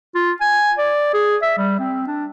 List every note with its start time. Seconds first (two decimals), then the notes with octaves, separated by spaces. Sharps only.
0.15 F4
0.41 G#5
0.78 D5
1.13 G#4
1.42 E5
1.58 G3
1.79 C4
2.07 D4